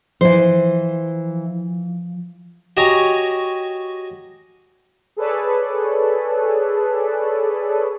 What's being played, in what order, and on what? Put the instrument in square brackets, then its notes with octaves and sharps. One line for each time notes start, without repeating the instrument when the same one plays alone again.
[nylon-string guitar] E3 C5 [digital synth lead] F3
[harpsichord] F#4 G4 C#5 D#5 G#5 A#5
[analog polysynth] G#4 A4 B4 C#5 D5